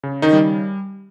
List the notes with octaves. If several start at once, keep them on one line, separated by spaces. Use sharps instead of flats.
C#3
D#3 D#4
G3